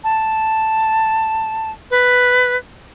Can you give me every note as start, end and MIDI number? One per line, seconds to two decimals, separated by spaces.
0.04 1.71 81
1.91 2.56 71